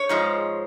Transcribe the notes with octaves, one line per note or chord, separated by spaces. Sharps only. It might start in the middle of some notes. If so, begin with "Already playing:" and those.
Already playing: C#5
G#2 F3 G#3